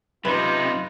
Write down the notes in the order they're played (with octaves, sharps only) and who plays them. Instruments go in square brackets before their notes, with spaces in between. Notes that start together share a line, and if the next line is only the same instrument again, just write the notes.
[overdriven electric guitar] F#2 D#4 [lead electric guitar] C3 [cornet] F4 [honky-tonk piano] B4